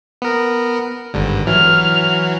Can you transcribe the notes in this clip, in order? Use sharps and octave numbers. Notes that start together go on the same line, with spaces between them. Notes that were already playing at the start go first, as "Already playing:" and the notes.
B3 A#4
G#1 G2 D3
E3 F#3 F6